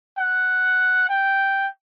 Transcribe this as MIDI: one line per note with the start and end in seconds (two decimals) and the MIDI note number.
0.18 1.05 78
1.09 1.67 79